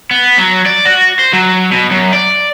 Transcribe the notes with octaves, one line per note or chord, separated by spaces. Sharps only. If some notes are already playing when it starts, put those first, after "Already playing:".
B3
F#3
D5
F#4
C5
F#3
B2
F#2
D5